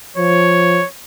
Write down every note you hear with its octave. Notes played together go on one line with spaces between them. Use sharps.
F3 C#5